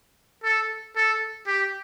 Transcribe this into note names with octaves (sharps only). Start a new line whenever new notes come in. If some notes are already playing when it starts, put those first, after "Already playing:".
A4
A4
G4